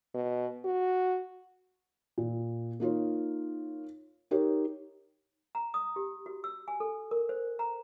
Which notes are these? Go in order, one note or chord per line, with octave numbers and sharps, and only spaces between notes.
B2
F#4
A#2
A#3 D#4 F4 C#5
D#4 G4 A#4 C#5
A#5
D#6
G4
F#4
E6
G#5
A4
A#4
C5
A#5